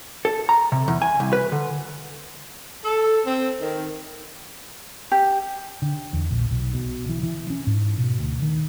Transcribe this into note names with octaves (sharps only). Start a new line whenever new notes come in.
A4
A#5
C3
E2
G#5
C2
B4
D3
A4
C4
D#3
G4
D3
E2
A#1
B1
B2
E3
E3
C#4
G#2
B2
D2
D#3